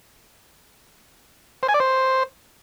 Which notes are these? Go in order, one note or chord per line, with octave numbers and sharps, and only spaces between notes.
C5
G#5
D5
C5